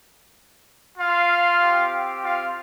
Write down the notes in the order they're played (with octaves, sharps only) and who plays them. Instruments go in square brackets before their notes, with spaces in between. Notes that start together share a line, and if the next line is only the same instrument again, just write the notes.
[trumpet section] F4 F5
C4 G4
F4 F5